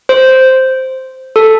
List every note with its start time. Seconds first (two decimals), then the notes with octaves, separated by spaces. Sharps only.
0.09 C5
1.36 A4